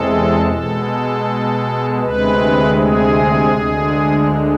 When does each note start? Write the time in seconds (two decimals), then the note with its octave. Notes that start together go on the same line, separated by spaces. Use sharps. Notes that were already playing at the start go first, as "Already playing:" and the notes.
Already playing: E2 C3 G#3 A4
0.49 B2 G#3 A4
2.02 D2 C3 G#3 B4
2.78 G#4
3.55 D2 D3 G#3